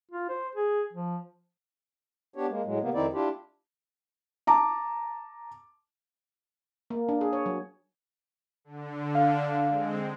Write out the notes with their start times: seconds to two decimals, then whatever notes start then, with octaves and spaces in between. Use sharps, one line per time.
0.12 F4
0.29 C5
0.55 G#4
0.93 F3
2.36 B3 D4 G4 C#5
2.49 G#3 A#3
2.65 A2 F#3 G#3
2.82 C3 A#3 B3
2.94 F2 D#3 C4 D#4 E4 D5
3.13 D4 E4 F4 G4
4.47 A5 A#5 D6
6.90 A#3
7.09 D4
7.21 G#4
7.33 C#5
7.46 F#3
8.65 D3
9.15 F5
9.68 G#3 C4